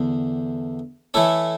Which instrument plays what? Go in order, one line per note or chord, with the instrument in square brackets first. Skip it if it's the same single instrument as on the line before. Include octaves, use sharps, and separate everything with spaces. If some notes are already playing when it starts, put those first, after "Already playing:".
Already playing: [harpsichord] E2 D3
E3 A3 E4 A4 C#5